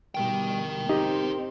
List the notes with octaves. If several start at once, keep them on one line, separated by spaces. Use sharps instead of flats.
B2 G3 A#4 G5
C4 D#4 G4